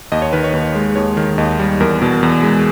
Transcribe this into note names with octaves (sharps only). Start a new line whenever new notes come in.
D#2 D#5
C#5
D#3 B4
C#5
D#2 B4
G#3
D#2 C#5
D#3
D#2 D#5
G3
E2 A#4
B2
E2
G#3